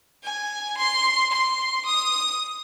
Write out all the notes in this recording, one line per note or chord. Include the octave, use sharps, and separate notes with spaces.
G#5
C6
C6
D#6